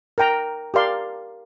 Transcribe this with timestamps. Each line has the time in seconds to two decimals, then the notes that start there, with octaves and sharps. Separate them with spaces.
0.18 A#4 G5 A#5
0.74 G4 A#4 D5 F5 C6